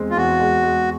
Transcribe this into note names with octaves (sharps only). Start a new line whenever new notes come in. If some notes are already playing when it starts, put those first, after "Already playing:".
Already playing: E2 G#3 C4
F4
E2 F#4
G#3
G#3